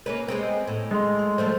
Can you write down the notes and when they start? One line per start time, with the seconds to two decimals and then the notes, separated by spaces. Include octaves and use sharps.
0.06 A#3 C#4 B4
0.28 G#3 B3 C4
0.67 A2
0.91 G#3 D#5 G5 C6
1.19 C6
1.38 F3 G3 A3 C5